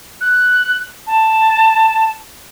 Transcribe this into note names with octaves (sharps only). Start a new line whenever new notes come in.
F#6
A5